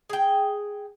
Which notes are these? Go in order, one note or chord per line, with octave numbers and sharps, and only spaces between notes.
G#4 G5